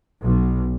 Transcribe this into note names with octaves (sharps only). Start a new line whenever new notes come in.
B1